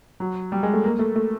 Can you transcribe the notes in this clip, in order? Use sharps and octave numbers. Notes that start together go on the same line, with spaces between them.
F#3
G3
G#3
A3
A#3
A3
A3